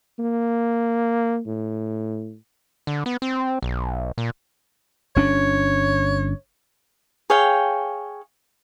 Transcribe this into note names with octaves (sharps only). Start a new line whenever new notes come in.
A#3
A2
D3
B3
C4
B1
A#2
G1 C#4 D4 C#5
G#4 C#5 F5 G5